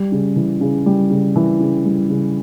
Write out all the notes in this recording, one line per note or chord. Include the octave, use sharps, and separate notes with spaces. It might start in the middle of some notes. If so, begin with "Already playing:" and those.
Already playing: G3
C#3
E3
C#3
G3
C#3
E3
C#3
G3
C#3